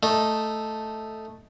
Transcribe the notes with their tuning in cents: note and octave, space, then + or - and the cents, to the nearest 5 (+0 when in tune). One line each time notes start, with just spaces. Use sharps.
A3 +0 D#4 +0